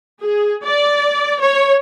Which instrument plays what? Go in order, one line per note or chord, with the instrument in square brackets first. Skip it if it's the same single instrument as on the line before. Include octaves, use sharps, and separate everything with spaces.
[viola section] G#4
D5
C#5